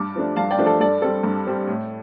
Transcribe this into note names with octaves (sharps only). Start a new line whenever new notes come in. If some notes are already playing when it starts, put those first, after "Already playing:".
Already playing: G2 A5 D6
F3 A3 D4
G2 F5 A5
D5 G5
F3 A3 D4
A4 D5
G2 A4 D5
G3 C4 A4
G2
G3 C4
A2